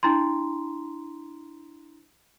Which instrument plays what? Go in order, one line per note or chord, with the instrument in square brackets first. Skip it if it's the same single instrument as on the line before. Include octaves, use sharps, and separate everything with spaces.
[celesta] D4 E4 A#5 C6